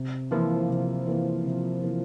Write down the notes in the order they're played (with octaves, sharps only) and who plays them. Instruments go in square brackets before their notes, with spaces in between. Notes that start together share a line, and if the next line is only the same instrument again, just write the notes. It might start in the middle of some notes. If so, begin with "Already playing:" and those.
Already playing: [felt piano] C3
[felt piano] E3 A#3 E4 [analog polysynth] F3
[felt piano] C3
E3 A#3 E4
C3
E3 A#3 E4